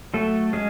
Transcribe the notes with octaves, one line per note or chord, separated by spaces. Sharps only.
F#3 A3 A4
G#3 C#4 G#4